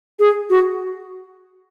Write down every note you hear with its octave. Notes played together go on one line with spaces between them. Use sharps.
G#4
F#4